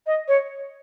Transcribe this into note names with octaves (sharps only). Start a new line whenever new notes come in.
D#5
C#5